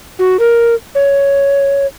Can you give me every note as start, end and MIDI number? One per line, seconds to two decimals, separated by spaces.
0.19 0.37 66
0.40 0.75 70
0.95 1.86 73